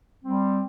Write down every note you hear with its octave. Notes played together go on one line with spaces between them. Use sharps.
G3 C4